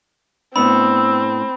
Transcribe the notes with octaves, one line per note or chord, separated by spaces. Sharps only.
A2 B3 C4 D4 B5 E6